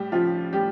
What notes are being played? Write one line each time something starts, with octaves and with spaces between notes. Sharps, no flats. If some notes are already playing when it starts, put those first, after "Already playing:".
Already playing: A2 G3 G4
F3 F4
A2 G3 G4